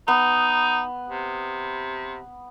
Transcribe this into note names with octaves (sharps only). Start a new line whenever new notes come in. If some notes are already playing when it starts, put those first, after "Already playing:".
B3 D#4
C3